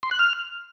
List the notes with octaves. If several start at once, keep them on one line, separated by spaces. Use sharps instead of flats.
C6
F#6
F6